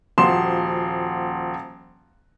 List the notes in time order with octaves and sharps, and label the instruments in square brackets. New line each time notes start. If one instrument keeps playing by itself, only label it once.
[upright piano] D#1 F3 F#4 C6 E7